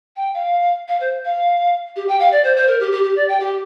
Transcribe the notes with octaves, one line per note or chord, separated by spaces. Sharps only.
G5
F5
F5
C5
F5
G4
G5
F5
D5
C5
C5
A#4
G4
G4
G4
D5
G5
G4